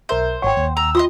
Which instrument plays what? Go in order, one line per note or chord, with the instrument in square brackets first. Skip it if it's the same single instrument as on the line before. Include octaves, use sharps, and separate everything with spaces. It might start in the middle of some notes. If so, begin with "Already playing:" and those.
[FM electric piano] B1 A#4 E5 [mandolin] C5
[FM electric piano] G#1 C#6 [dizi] C#5 [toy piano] F#5 G5
[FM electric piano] D#2
[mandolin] A#5 [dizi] E6
[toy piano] F4 [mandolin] D#5 C6 D#6